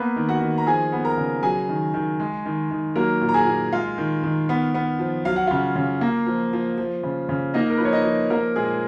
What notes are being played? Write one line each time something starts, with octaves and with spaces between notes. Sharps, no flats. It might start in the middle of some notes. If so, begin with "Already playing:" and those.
Already playing: A#3 B3 B4
D#3
F#4 F#5
D#3
A#5
F3 G#4 G#5
B3
A#4 A#5
C#3
F#3 G#4 G#5
D#3
D#3
G#3
D#3
D#3
F#3 A#3 A#4
A#2
A#5
G#4 G#5
A#2
G#3 F4 F5
D#3
D#3
B3
B3
F3
F#3 F5
F#5
C#3 F4 F5
C#3
A#3
F3
F3
F3
C#3
C#3
A#3 D#4 D#5
A#4
F3 B4
C#5
D#4 D#5
F3
F3 A#3 A#4
A#2 G#3 G#4